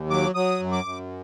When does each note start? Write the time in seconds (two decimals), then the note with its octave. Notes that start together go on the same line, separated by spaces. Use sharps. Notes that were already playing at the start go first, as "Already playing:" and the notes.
Already playing: D#2
0.10 F#3 D6
0.35 F#3 D#6
0.60 F#2
0.72 D6
0.85 F#2